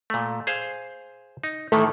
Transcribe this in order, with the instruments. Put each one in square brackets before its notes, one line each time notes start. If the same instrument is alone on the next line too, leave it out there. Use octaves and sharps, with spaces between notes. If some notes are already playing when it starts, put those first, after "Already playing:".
[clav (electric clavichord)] A#2 A3
G#4 C5 F5
D#4
[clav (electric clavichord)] A2 D#3 E3 [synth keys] A3